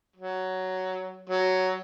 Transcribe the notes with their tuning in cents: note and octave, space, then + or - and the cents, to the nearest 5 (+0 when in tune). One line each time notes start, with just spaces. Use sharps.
F#3 +10
F#3 +10